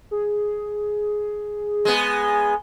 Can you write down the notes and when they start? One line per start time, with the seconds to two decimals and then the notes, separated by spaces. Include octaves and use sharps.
0.11 G#4
1.85 G#3 B3